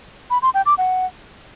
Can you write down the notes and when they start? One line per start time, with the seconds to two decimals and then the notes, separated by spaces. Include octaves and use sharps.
0.30 B5
0.42 C6
0.54 G5
0.66 D6
0.78 F#5